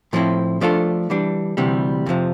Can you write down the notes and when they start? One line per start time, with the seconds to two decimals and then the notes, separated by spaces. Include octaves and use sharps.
0.13 A2 F3 C4 E4
0.61 F3 A3 D4 F4 A4
1.10 E3 G3 D4
1.57 D2 C3 E3 G3
2.06 F2 C3 F3